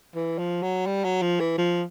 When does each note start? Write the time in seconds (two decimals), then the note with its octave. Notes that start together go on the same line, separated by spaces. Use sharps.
0.15 E3
0.38 F3
0.62 F#3
0.86 G3
1.04 F#3
1.22 F3
1.40 E3
1.58 F3